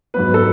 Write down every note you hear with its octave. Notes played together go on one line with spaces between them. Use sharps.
G#2 F#3 B3 B4
A4